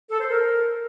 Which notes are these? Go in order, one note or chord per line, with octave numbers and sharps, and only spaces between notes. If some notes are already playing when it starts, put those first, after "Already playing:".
A4
C5
A#4